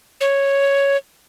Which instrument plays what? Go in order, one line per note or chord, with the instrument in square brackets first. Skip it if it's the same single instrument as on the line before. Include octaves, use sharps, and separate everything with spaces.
[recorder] C#5